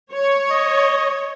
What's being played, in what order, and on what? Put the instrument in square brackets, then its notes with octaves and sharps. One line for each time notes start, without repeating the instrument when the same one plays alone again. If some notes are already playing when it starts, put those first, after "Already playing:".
[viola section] C#5
[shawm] D#5